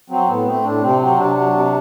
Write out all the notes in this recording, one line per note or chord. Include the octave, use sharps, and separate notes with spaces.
F#3 C4
A2 B3
A3 C4
A2 D4
C3 C4
F#3 C4
C3 D4
F#3
C3